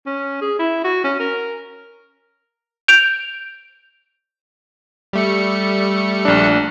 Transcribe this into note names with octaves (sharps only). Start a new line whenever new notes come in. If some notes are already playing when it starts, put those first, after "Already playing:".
C#4
G#4
E4
F#4
C#4
A#4
G6 D7 F7
G3 A3 C#7
A#1 D4